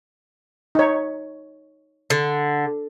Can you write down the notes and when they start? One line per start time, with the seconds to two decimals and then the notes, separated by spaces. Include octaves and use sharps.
0.75 D#4 C#5
2.10 D3